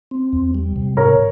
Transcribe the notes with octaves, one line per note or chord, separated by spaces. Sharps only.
C4
E2
G3
C3
G#2 A#4 C#5